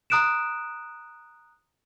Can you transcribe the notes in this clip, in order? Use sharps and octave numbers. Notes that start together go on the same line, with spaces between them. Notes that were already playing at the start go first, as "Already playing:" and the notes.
A#5 D#6 F#6 D7 E7